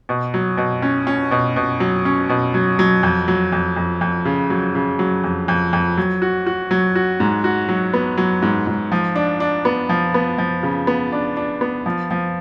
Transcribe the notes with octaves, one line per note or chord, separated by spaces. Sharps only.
B2
F#3
B2
C#4
C#4
B2
B2
F#3
C#4
B2
F#3
F#3
F2
F#3
F2
F2
F2
C#3
F#3
C#3
F#3
F2
F2
F2
F#3
F#4
F#4
F#3
F#4
G#2
F#4
F#3
B3
F#3
G#2
G#2
F3
D4
D4
B3
F3
B3
F3
C#3
B3
D4
D4
B3
F3
F3